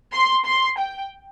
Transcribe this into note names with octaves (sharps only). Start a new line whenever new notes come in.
C6
C6
G5